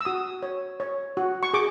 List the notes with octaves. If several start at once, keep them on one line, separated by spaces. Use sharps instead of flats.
E6
F#4 D#6
C#5
C#5
F#4
C#6
G#4 D6